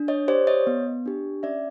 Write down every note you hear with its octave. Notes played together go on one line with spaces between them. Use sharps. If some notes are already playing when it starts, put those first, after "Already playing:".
Already playing: D4
C#5 D#5
G4 C5 D5
C#5 D#5
B3
D4 G4
C#4 D5 E5